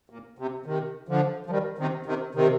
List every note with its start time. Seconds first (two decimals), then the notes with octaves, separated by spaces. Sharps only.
0.10 A#2
0.39 C3
0.66 C3 D#3
1.09 D3 F3
1.46 F3
1.50 D#3 G3
1.78 C3 D#3
2.06 C3 D#3
2.35 C3 D#3